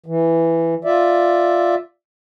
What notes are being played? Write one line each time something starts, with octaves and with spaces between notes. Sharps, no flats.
E3
F4 D5 E5